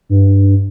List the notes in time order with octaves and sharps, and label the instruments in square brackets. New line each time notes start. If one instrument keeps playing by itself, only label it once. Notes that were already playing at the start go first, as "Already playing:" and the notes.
[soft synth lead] G2